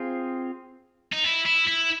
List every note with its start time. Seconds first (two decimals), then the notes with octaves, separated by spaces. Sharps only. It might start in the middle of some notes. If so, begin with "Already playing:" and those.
Already playing: C4 F4 G#4
1.12 D#4
1.24 E4
1.46 E4
1.67 E4